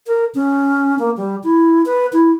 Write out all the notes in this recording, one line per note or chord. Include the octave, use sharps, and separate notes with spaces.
A#4
C#4
A#3
G3
E4
B4
E4